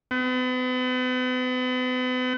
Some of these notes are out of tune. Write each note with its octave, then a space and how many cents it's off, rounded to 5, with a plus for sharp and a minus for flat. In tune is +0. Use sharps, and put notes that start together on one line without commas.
B3 +40